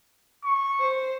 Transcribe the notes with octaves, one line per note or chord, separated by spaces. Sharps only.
C#6
C5